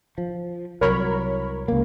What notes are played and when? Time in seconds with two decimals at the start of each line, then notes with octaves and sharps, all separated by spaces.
0.18 F3
0.81 C2 F#3 A#4 C#5 B5
1.68 C#2 A#3